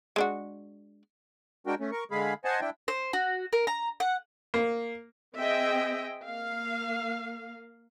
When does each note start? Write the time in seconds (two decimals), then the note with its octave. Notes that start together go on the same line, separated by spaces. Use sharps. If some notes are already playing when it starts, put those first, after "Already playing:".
0.16 G#3 D4 F#4
1.67 G#3 D4 F#4 A#4 G5
1.80 A3 C#4
1.91 A#4 C#6
2.11 D3 G#3 G#4 F5 B5
2.45 C5 D#5 F#5 G#5 A5
2.61 D4 E4 G5
2.88 C5
3.13 F#4
3.53 A#4
3.67 A#5
4.00 F#5
4.54 A#3
5.37 C4 G#4 D#5 E5 G5
6.25 A#3 F5